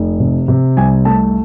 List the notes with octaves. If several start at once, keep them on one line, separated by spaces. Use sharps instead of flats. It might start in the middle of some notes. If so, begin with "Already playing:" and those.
Already playing: F1
C3
C3
C2 G#5
A3 A5